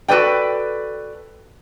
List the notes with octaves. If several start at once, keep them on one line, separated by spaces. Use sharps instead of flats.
F#4 A4 B4 D5 G5